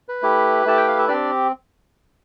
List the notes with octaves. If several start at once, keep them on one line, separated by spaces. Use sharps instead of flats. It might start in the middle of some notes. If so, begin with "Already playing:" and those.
B4
A3 E4 G4
A3 E4 G4 A5
G5
F5
E5
C4 D4 G4 D5